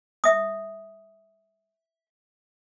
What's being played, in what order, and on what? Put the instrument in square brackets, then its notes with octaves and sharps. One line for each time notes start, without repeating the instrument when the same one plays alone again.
[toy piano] E5 D#6